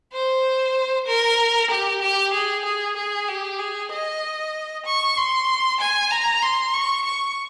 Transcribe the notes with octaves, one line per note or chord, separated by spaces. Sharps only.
C5
A#4
G4
G4
G#4
G#4
G#4
G4
G#4
D#5
C#6
C6
G#5
A#5
C6
C#6
C#6